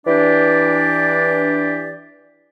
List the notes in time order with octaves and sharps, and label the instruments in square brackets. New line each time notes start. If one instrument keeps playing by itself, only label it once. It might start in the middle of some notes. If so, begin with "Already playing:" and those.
[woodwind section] E3 D4 G4 D5